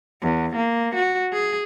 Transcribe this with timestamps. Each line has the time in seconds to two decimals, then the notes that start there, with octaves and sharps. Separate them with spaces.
0.22 E2
0.55 A#3
0.95 F#4
1.33 G#4